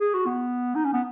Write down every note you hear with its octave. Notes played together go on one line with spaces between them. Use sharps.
G#4
F#4
B3
D#4
C#4
B3